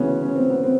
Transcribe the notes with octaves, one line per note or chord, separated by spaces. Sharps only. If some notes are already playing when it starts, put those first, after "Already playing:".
Already playing: D2 C#3 E3 B3 C#4
C#4
C4
B3
C4